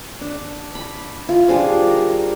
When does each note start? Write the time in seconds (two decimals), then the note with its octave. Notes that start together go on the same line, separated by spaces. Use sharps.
0.21 D4
0.75 B5
1.29 F4
1.48 G3 D4 G#4 C5
1.87 A#4